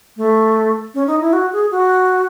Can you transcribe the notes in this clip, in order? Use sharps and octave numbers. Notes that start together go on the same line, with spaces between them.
A3
C#4
D#4
E4
F#4
G#4
F#4